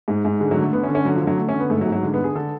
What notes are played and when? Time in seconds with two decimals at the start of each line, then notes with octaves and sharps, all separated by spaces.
0.08 G#2 G#3
0.25 G#2
0.40 D3 G#3
0.51 F#3
0.57 D3
0.62 A3
0.73 D3 B3
0.83 C#4
0.89 D3
0.95 C#4
1.05 D3 F#3
1.16 F3
1.22 D3
1.27 F#3
1.38 D3 A3
1.49 C#4
1.54 D3
1.60 B3
1.70 G#2 A3
1.81 F#3
1.87 G#2
1.92 F#3
2.03 D3 G#3
2.14 B3
2.19 D3
2.24 G#4
2.35 D3 A4